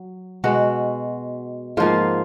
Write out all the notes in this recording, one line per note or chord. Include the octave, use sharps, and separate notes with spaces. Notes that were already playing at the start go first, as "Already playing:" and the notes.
Already playing: F#3
B2 G#3 F#4
G#2 F3 A#3 F4